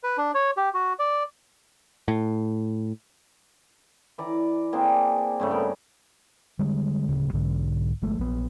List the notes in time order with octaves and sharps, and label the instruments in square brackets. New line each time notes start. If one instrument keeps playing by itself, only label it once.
[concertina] B4
D4
C#5
G4
F#4
D5
[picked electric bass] A2
[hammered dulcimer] E3 D5 A#5
A#3 C4 D4 G#4
G2 C#3 A3
B3 A#4
[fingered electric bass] D3 G3 G#3
D1 C#3
B1 G#2 D3
G1 F3 G#3 A3
A#1 B3